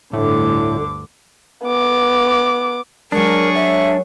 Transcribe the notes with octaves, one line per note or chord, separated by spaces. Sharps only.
G1 D2 A2 D3 D6
B3 D6
F#3 G#3 D4 G#4 A#4 C#6
A#4 C#5 E5 F#5